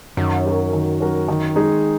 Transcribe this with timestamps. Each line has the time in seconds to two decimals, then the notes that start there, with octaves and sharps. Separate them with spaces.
0.17 F#2 D#3
0.46 F#3 C#4 F#4 A#4
0.73 D#3
1.00 F#3 C#4 F#4 A#4
1.28 D#3
1.56 G#3 D#4 G#4